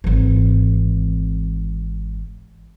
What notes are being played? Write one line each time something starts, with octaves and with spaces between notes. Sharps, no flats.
G#1 E3